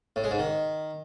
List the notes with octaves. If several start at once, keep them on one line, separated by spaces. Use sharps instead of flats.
A2
G#3
G#2
D#3